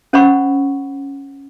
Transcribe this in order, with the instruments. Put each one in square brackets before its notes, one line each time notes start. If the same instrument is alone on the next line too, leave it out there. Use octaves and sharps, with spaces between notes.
[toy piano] C#4 C5 C#5 F#5 B5 C#6